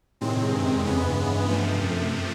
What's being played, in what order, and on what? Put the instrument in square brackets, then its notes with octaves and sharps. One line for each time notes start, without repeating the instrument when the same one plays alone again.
[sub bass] A2 [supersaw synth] C3 D#3 G#3 C4
[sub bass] A2
G2
F#2
E2
[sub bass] F2 [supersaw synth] C#3 E3 G#3 B3
[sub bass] E2
F2
G2
[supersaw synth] C3 F3 A3
[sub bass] F#2
F#2